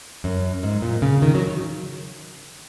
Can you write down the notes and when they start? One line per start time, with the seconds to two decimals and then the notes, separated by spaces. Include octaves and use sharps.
0.24 F#2
0.63 G#2
0.82 A#2
1.02 C#3
1.22 D#3
1.35 F#3